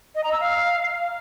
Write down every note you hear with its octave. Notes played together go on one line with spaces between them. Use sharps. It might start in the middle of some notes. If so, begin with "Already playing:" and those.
D#5
A#5
E6
F5